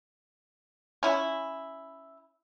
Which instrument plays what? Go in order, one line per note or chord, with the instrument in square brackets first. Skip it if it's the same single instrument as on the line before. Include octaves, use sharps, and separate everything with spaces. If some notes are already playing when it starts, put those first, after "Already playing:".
[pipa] C#4 E4